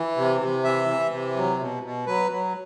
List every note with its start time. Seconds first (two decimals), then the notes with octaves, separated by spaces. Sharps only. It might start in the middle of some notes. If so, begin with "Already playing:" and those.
Already playing: E3
0.17 C3
0.41 C3
0.64 E3 E5
0.88 E3
1.11 C3
1.36 F#3
1.59 B2
1.83 B2
2.06 F#3 B4
2.31 F#3